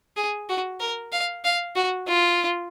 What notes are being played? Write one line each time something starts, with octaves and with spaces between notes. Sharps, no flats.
G#4
F#4
A#4
F5
F5
F#4
F4